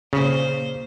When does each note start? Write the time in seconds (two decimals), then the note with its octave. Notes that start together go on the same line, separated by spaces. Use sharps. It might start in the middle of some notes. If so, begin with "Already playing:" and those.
0.13 A#2 C#3 C5